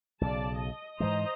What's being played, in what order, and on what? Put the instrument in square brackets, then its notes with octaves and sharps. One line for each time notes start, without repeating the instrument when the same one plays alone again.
[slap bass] B1 C#3 [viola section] D5 A5
[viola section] D#5
[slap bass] G#2 E3 G#3 [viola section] C5 D#5 A#5